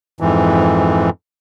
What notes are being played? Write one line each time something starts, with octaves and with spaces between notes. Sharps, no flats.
F2 G#2 E3